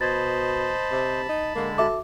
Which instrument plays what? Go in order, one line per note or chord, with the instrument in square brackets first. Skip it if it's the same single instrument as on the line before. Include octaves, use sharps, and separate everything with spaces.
[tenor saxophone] B2 [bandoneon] C5 D#5 [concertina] A5 B5 [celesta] G#6 A6
[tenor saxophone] C3
D#4
[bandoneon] D3 G#3 [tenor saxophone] A#3
[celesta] F#4 E5 D6 [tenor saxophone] A4